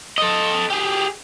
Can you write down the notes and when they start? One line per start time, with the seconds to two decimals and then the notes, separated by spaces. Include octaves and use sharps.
0.18 A4 D#5
0.70 G4 G#4